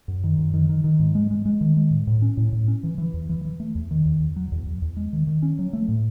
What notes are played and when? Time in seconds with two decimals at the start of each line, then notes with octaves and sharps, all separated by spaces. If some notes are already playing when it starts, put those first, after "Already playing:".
0.08 F#2
0.24 D#3
0.39 F#2
0.54 D#3
0.69 D#3
0.84 D#3
1.00 G#2
1.15 G#3
1.31 G#3
1.46 G#3
1.61 D#3
1.77 G#3
1.91 A2
2.07 A2
2.22 C#4
2.37 A2
2.52 A2
2.68 C#4
2.83 E3
2.98 E3
3.14 E2
3.29 E3
3.45 E3
3.60 A3
3.75 E2
3.91 D#3
4.06 E2
4.20 E2
4.36 F#3
4.52 E2
4.66 E2
4.82 E2
4.97 G#3
5.13 D#3
5.27 D#3
5.42 C#4
5.59 F#3
5.73 A3
5.88 A2